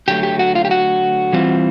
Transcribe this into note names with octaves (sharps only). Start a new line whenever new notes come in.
D3 F#3 A3 G4
G4
F#4
F4
G4
F#4
E3 G3 C4 F4